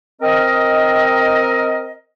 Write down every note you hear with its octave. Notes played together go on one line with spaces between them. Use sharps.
C4 A#4 D#5